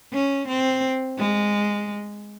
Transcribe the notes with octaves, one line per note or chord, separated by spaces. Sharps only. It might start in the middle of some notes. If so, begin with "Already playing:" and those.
C#4
C4
G#3